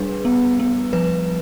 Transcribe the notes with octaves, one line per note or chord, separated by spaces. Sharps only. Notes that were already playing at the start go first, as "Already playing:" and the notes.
Already playing: G3 D4 G#4 B4
B3
B3
F3 B4